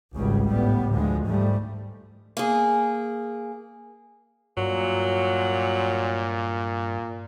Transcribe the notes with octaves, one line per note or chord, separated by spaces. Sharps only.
G#1 C#2 G#2 C#3 G3
A2 G3 B3
D2 D3 F3 G#3
G#2 F3 G3 A3
A#3 G#4
G2 A#2 F#3